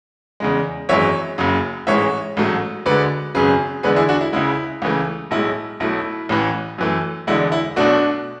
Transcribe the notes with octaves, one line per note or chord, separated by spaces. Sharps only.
E2 C#3 G#3
G#1 F#2 E3 G#3 C#5 E5
F#1 F#2 C#3
A1 G#2 E3 G#3 C#5 E5
A1 G#2 F#3 A3
D2 D3 G#3 B4 D5
G#1 F#2 C#3 G#4 B4
E2 D3 G#3 G#4 B4
E4 G#4
D4 F#4
E4
C#2 C#3 G#3 E4
C#2 C#3 E3 A3
B1 A2 G#3 E4
B1 B2 A3 E4
A1 A2 E3
F#2 E3 A3
E1 E2 D3 G#3 E4
E4
B1 B2 A3 D4 F#4